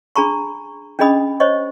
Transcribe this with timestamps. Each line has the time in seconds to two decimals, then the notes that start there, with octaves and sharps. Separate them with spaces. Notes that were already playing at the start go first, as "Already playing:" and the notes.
0.16 D4 G#4 A#5 B5 C#6
0.99 C#4 D4 G#4 D#5 B5 D#6
1.40 C5 C#5 D#5 C#6